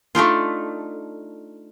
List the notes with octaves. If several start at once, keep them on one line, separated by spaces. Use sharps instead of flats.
A3 D4 D#4 F4